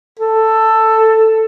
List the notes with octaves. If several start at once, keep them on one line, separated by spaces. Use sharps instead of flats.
A4